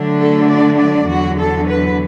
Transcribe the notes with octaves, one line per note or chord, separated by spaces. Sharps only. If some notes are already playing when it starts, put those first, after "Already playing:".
Already playing: D3 F#3 A3 D4
A4
D5
D5
E2 D3 F#3 F#4
A4
B4